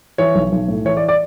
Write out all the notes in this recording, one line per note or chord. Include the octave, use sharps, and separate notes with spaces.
E3 C#5
B1
B1
A2
E3 C#5
D5
D5